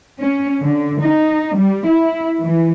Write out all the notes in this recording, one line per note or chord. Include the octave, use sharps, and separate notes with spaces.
C#4
D3
D#4
G3
E4
E3